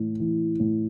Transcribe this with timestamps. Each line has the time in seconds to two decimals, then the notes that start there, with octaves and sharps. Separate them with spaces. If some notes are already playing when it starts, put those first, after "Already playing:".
Already playing: A2 E3
0.20 E3
0.60 A2